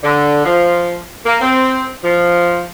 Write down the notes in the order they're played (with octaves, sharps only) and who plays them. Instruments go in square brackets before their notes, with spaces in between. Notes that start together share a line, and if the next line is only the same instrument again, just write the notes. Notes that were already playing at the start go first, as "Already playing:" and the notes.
[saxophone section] D3
F3
A#3
C4
F3